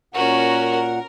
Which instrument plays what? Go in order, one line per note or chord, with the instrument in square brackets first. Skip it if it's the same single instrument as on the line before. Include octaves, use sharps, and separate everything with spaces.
[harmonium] A#2 F#5 [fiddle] C#4 F#4 [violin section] A#4